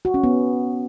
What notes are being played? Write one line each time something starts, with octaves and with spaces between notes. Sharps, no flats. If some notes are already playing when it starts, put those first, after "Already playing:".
F#4
C#4
B3